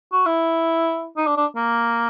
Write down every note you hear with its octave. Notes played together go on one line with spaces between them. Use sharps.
F#4
E4
D#4
D4
D4
A#3